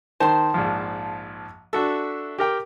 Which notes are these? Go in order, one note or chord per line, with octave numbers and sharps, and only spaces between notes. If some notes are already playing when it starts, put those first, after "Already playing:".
D#3 C5 A5 C6
A#1 G#2 F3
D4 F#4 A4 E5
G4 A#4 G5